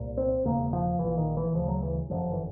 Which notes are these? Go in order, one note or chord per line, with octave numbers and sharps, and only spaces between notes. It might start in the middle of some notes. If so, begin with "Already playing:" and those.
Already playing: C2 A#2
C4
E1 E2 C#3 A#3
F3
A#1 A#2 E3
D#3
E3
D2 C#3 F3
F#3
E3
G1 F#2 D3 F3
E3